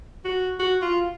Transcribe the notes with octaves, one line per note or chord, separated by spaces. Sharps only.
F#4
F#4
F4